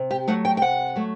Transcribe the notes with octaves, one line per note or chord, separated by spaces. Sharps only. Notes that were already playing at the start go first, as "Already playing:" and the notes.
Already playing: C3
G4
F#3 A3 F#5
G5
G5
C3 F#5
F#3 A3